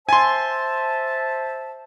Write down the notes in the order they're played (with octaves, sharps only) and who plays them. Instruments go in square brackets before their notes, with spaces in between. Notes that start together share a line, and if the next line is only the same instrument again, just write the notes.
[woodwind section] C5 E5 A5 [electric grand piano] G#5 C6